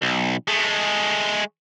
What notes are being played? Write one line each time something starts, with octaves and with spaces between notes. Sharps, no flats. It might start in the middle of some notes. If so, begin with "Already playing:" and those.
B1
G#3 A3